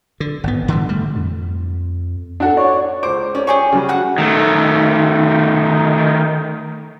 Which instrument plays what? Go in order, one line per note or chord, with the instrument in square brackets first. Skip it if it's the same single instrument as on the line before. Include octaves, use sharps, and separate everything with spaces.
[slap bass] D3
G#1 B3
D3 E3 G3
G3 A3
[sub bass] F2
[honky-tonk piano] D4 F#4 A4
[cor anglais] C#5 [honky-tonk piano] D5
[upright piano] C#2 C5 [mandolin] D6
[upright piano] C#4 [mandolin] D5
[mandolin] G4 G#4 C#6 [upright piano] C#5
[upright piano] C#3 F#3 G3
[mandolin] F#4 F#5 F#6
[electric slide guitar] D#3 A3